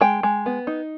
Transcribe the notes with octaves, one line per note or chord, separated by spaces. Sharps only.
G#3 G5
G#3
B3
D#4